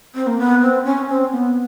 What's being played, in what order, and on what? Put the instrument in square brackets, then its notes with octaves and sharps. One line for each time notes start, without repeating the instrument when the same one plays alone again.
[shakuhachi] C4
A#3
B3
C4
C#4
C4
B3